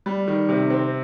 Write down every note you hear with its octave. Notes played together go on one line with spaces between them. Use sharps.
G3
D#3
C3
C4